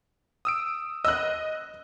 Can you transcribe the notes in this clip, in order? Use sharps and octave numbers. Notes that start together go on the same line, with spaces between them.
D#6 E6 D7
D#5 E6 F#6